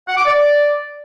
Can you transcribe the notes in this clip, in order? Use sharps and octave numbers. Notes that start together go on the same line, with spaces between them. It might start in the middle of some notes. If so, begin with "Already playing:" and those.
F#5
D6
D5